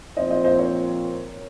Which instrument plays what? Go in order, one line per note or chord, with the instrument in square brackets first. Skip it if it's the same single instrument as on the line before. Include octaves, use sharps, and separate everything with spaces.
[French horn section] A#2 F3 C4 [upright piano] C5 D#5
[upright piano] C5 D#5
C5 D#5
A#4 C#5